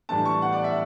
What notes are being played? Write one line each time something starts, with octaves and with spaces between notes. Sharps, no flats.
A2 E3 G3 D4 A5
C#6
F#5
D5
E5